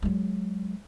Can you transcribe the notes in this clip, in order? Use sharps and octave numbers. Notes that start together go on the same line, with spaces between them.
F#3 G#3